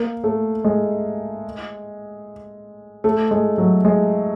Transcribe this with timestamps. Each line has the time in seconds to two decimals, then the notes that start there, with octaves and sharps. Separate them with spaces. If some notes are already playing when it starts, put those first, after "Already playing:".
Already playing: A#3
0.24 A3
0.65 G#3
3.04 A3
3.31 G#3
3.58 F#3
3.85 G#3